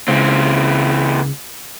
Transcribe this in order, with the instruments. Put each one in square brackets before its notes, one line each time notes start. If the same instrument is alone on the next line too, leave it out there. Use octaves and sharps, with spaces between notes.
[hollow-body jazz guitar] C#2 [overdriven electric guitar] E3 C4